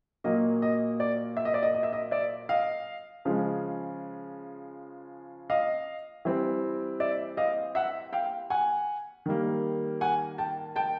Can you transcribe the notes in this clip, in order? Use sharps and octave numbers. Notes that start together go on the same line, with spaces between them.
A#2 F#3 A#3 D#5
D#5
D5
E5
D#5
D5
D#5
D#5
E5
D#5
D5 E5
D#5 F5
C#3 F3 G#3
D#5 F5
E3 G3 C4
D5 E5
D#5 F5
E5 F#5
F5 G5
F#5 G#5
D#3 G3 A#3
F#5 G#5
G5 A5
G5 A5